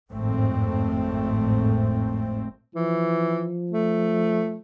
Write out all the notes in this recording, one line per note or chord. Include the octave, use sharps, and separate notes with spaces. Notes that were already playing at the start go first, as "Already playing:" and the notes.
G#1 F2 A2 A3 C4
E3 F3
A3